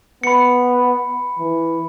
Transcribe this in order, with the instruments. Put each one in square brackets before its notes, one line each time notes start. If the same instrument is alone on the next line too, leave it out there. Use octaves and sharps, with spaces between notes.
[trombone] B3 [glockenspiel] B5 C#7
[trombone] E3